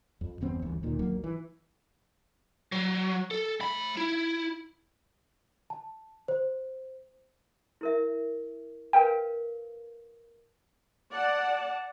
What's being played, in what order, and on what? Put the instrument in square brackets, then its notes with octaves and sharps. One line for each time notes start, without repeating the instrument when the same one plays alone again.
[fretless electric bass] F2
G1 E2 B3 C4
G1 D2 E3
D2 A#2 D#3
G#1 D2 F#3 A#3
E3
[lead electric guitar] F#3
A4
A3 B5
E4
[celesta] A5
C5
[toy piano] E4 A#4 E5
[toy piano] A#4 B4 F5 [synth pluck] G5
[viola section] D5 F#5 A5